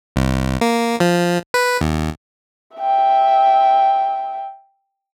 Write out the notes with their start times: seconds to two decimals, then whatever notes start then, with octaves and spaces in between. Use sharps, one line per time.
0.16 C2
0.61 A#3
1.00 F3
1.54 B4
1.81 D#2
2.77 E5 G5